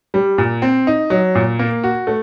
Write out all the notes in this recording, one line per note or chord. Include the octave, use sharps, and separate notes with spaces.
G3
A#2
C4
D#4
F#3
A#2
A#3
F#4
A3